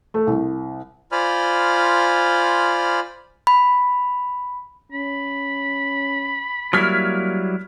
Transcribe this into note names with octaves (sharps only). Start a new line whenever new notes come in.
A3
C2
F4 C5 D5 G#5 B5 F6
B5
C#4 B5
F#3 G3 A#3 E4 F6 G#6 B6